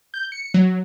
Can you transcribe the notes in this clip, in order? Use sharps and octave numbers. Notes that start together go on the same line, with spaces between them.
G6
C#7
F#3